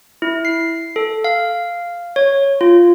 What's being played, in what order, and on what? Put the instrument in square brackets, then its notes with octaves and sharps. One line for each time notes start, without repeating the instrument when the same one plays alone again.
[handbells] E4
C7
A4
F5
C#5
F4